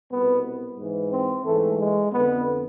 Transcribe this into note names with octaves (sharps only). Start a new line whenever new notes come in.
C2 B2 B3
G#2 E3
C4
G#2 E3 A3
G#3
F2 D3 B3